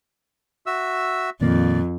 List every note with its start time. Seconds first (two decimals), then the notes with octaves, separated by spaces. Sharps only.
0.66 F#4 E5 E6
1.41 F2 A#2 D#3 A#3 D5